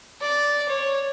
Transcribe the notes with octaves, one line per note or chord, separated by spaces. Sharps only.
D5
C#5